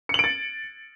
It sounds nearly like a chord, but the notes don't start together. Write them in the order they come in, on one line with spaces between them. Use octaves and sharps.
C#7 F#7 D7 A6